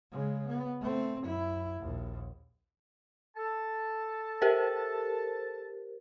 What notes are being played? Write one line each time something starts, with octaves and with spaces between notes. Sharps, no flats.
C#3 G#3
B3
A3 C4
F#2 E4
A#1 D#2
A4 A5
G4 A#4 C5